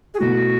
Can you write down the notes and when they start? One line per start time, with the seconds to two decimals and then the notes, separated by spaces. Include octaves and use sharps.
0.14 G#4
0.19 B2 A3 E4 F#4